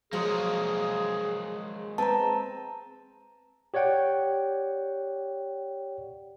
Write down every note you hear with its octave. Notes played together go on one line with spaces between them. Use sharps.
F3 F#3 G#3 A#3 G#4
C4 B4 A5 A#5
G4 C#5 D5 F#5 G5